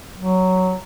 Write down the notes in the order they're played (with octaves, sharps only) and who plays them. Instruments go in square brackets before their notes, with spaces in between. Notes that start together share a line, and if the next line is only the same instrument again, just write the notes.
[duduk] F#3